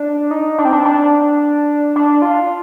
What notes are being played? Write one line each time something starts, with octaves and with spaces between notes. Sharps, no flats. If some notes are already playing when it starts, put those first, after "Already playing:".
Already playing: D4
D#4
D4
C4
D4
D4
D4
F4